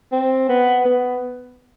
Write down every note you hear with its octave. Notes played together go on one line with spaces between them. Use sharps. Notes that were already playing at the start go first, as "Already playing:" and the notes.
C4
B3
B3